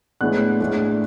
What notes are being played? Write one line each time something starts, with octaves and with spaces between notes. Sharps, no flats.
A2 G#3 B3 D4 F#6
A2 G#3 D4